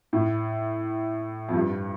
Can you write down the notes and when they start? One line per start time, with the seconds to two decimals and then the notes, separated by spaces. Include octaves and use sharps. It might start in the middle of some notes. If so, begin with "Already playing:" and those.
0.13 A2
1.49 F2
1.54 G2